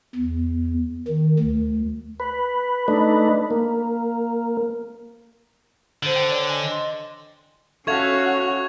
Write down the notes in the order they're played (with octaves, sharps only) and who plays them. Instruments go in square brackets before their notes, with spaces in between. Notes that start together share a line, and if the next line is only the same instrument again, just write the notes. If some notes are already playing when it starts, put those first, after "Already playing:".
[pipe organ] E2
D#3
D2
[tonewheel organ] B4
A3 D4 D#4 B4
A#3
[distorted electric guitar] D3 [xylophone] C5 F#7
[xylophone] G5
C#5 D5 G5
D#5 G#5
D#5 C6
[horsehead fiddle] C#4 F#4 [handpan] A4 E5 F5 [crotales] C#6 G#6 F7